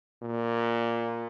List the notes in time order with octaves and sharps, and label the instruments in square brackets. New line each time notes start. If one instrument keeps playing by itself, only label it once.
[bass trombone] A#2